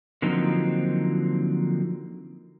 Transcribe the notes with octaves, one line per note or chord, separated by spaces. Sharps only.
D3 F3 F#3 A#3 C4 D#4